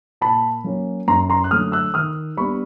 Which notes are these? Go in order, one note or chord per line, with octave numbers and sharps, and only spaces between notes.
A#2 A5 B5
F#3 A#3 C#4
F#2 A#5 C6
A#5 C6
F#6
D3 F#3 A3 D#6 F6
E6 F#6
D#3 D#6 F6
G3 B3 D4 B5 C#6